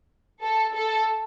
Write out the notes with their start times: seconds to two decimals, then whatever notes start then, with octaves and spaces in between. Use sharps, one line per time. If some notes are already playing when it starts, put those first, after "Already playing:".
0.42 A4
0.74 A4